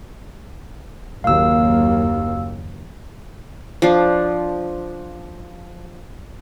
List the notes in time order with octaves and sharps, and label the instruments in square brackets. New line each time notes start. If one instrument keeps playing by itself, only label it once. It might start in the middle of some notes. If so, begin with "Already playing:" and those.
[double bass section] F#1 D#2 A#3 [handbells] F5 E6
[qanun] F3 D4